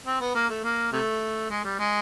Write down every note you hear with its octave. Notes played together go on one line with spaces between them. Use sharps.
C4
B3
A#3
A3
A#3
C3 A3
G#3
G3
G#3